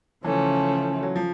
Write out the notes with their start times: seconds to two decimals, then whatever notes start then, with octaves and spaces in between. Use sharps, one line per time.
0.24 C#3 E3 F3 A3 C#4
1.03 F#3
1.16 F3